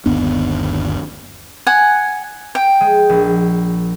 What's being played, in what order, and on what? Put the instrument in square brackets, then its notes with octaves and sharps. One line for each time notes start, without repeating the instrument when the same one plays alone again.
[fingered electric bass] G1 D#2 B3 D4
[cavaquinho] F#5 G#5
G5
[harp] G#3
A#1